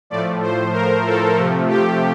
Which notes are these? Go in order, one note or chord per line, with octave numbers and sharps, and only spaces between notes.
A2 F3 A3 D5
C5
A#4
A4
C3 F3 A3
G4